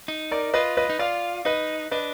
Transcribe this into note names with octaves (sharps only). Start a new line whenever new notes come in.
D#4
A#4 D5
F4 B4 D#5
B4 D#5
D#4
F4 D5 F5
D#4 B4 D#5
D4 B4 D#5